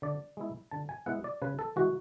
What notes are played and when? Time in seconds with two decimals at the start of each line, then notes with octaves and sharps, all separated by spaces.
0.02 D3 D5
0.37 G#3 B3 E4
0.71 D3 A5
0.89 G#5
1.06 G#3 B3 E4 F#5
1.24 D5
1.42 C#3 B4
1.59 A4
1.76 E3 G#3 F#4